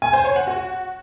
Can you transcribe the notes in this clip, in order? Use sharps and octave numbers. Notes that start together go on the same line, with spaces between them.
G#5
C5
C#5
F#5
F#4